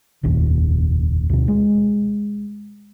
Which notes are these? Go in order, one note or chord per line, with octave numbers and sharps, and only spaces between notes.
F1 A#1 D#2
D2 B2
G#3